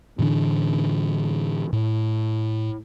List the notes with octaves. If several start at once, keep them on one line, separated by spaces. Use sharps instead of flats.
A2 D3 E3 D4
A2